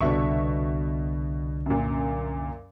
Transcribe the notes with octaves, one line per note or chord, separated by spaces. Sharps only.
C2 B2 D3 D4 E5 C#6
F#2 A#2